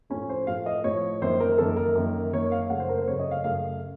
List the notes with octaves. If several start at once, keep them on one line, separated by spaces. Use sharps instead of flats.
A2 F3 A3 C#4
C5
A2 F3 A3 F5
D#5
A2 F3 A3 C#5
F#2 D#3 A#3 C5
A#4
F#2 D#3 A#3 A4
A#4
F#2 D#3 A#3
F#2 D#3 A#3 C#5
F5
F#2 C#3 A3 F#5
C5
A#4
C5
F#2 C#3 A3 C#5
D#5
F5
F#2 C#3 A3 F5